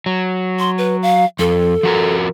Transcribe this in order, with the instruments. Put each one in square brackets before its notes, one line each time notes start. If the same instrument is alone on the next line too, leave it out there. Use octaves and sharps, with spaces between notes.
[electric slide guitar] F#3
[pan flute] C6
B4
F5
[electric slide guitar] F2 [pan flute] A4
[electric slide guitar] F3 F#4 A#4